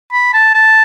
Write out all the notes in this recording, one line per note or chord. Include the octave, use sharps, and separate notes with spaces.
B5
A5
A5